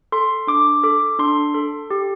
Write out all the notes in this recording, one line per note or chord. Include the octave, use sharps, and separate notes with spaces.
A4 C6
D4 D6
A4 D6
D4 C6
A4
G4